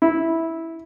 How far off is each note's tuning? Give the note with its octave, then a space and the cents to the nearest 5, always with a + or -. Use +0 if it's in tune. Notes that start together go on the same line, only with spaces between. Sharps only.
E4 -10